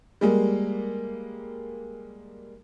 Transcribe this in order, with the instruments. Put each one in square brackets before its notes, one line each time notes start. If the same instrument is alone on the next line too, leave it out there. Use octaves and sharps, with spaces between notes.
[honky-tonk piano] G3 G#3 A#3